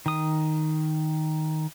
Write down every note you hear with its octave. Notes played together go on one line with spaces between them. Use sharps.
D#3 D#6